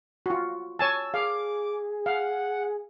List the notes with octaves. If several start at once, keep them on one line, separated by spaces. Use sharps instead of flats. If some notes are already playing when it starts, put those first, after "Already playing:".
F4 F#4
C#5 G#5 A5 E6
G#4 F5 D6
F5 F#5